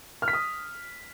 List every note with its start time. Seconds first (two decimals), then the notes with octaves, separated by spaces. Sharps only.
0.22 F6
0.28 B6
0.33 D#6